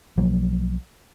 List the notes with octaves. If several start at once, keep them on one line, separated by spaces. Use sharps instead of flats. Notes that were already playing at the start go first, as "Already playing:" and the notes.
B1 F3 F#3 A#3